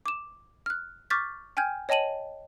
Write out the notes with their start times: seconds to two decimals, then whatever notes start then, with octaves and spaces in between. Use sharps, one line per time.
0.06 D6 E7
0.66 F6 F#6
1.10 C#6 D6 F6 G6 A6 B6
1.57 G5 G#5 F6 G6 G#6
1.89 C#5 D#5 G5 A5 D#7 F#7